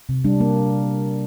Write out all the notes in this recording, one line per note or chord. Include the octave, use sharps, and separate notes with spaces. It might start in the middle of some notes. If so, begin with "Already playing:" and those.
C3
G3 D4
A#3